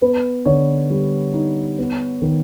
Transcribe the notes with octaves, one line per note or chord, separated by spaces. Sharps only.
B3 B4
D3 C#5
G3
D#4
B3
D#3